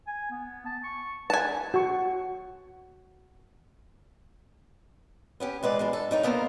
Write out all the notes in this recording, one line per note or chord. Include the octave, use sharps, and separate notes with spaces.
G#5
B3
A5
C#6
B4 G#5 A5
F#4 C#6
B3 C#4 G4
E2 G#3 B4 D5
F#2 G#3 D4
A4
G3 D#4 C#5
A#3 B3 A4 A#4 C5